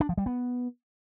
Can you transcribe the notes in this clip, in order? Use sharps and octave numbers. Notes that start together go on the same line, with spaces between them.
D4
F3
G3
B3